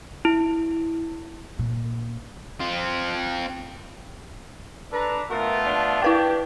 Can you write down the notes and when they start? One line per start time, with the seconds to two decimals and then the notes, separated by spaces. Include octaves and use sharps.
0.25 E4
1.59 A#2
2.60 C4 F4
4.93 D4 A4 B4 A#5
5.31 A3 B3 F4 A#4
5.66 D4
6.02 E4 G4 B4 G5